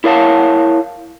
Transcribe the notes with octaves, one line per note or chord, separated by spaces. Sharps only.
E4 A#4 C#5 F5 A5